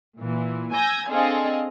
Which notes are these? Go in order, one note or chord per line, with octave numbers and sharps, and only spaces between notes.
A#2 E3
G#5 E6 G6 G#6 A#6
C4 D4 G#4 A4 D#5 F5